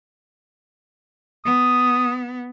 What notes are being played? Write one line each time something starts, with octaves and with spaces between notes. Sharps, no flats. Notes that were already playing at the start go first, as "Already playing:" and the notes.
B3 D#6